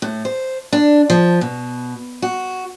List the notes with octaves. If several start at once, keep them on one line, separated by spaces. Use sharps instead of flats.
A2
C5
D4
F3
B2
F#4